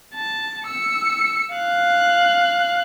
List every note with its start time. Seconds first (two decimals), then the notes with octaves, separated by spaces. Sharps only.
0.15 A5
0.66 E6 C#7
1.54 F5 F#6